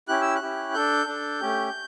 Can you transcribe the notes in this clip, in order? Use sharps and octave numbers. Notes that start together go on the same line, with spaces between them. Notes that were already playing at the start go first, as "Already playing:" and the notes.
C#4 E4 G4 F#6
E6
F#6
C#4 E4 G4
D4 A4 G6
D4 A4
A3 C#4 G4